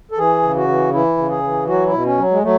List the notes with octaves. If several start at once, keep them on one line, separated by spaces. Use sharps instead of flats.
A4
E3 G#4
C#3
F#4
E3
E3 E4
C#3
G#4
E3
F#3 F#4
E4
B2
C#4
F#3
G#3
F#3 A3